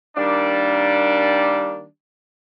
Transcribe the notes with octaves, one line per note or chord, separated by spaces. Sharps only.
D#3 G3 A#3 D4